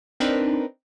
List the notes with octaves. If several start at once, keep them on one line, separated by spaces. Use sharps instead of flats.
C4 D4 D#4 A#4 B4